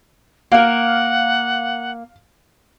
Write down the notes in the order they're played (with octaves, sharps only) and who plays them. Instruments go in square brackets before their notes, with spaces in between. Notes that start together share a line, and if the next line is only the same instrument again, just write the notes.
[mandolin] A#3 A#4 [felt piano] F5 [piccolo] F#5